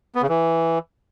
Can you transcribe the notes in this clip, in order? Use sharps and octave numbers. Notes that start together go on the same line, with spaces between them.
B3
C#3
E3